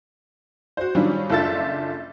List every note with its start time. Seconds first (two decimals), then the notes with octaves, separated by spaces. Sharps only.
0.77 F#4 C5
0.95 D#3 F#3 G3 C#4 D4 F4
1.30 F#1 D4 F4 A4 E5 A6